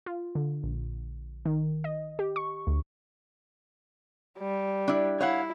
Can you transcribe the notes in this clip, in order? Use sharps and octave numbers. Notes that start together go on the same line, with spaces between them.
F4
D3
A#1
D#3
D#5
G4
C#6
D2
G3
D4 E4
E4 C#5 F5 F#5